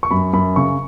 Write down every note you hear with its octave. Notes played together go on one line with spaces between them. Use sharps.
C#6
F#2 B5
F#2 B5
C#3 C#6